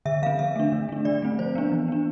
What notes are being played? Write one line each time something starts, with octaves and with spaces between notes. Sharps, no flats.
D3 E5
F3 C4 F5
D3 E5
A3 D4
D3
A3 D4
D3 D5
A3 C4
F3 C5
B3 D4
E3
B3 D4